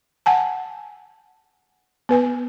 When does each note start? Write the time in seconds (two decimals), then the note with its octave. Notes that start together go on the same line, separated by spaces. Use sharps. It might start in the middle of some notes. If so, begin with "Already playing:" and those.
0.26 F#5 G#5 A5
2.09 B3 B4 G#5